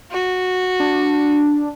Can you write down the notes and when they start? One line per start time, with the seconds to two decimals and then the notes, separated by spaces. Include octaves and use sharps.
0.11 F#4
0.80 D4